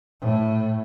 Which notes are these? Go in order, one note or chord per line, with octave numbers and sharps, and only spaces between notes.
A2